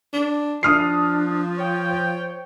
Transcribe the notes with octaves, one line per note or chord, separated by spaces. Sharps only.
D4
F3 D4 D#6 F6 C7
C#5 G5
C5